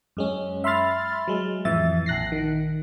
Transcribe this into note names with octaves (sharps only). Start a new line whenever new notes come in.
F#2 G#3 C#4
E5 B5 C6 F6 A6
F#3 G#3
F2 A2 E3 E5 A6
A#1 F#6 A#6 C7
D#3